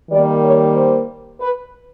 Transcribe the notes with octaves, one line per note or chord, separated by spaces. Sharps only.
D#3 G3 A#3 D5
C#5
C5
B4